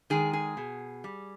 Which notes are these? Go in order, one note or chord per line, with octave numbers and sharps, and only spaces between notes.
D#3 G#3 G#4
G#4
B2
G3